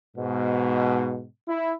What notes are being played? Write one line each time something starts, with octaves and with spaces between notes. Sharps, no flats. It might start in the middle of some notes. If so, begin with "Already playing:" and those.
G#2 B2
E4